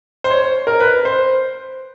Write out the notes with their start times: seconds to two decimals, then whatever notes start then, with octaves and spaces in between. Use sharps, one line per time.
0.24 C5
0.30 C#5
0.67 A#4
0.80 B4
1.05 C5